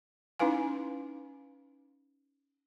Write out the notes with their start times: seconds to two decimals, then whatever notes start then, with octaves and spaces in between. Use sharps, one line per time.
0.39 C#4 D#4 E4 B4 F5 G#5